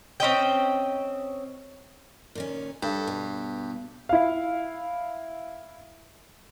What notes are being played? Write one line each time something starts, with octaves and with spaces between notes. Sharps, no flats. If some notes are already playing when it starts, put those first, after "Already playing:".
C4 C#4 D#5 G5
A#2 D#3 C#4
G2 A4
B2
E4 F5